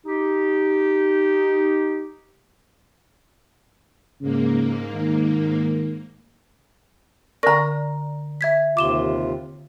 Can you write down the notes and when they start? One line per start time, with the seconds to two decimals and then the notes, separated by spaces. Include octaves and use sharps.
0.05 D#4 G4
4.21 G#2 C#3 A#3
4.94 D#3
7.43 D3 A#4 D5 A#5 C#6 A#6
8.41 E5 G#6 B6
8.77 D#2 C3 F4 D6 E7 G7